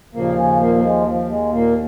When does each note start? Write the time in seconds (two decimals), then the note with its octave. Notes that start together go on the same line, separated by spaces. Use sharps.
0.14 D#2 A#2 C#3 F3 A#3
0.37 C#3 C#4
0.60 A#2 A#3
0.75 A#3
0.83 G#3
1.07 F3
1.29 G#3
1.52 A#2 A#3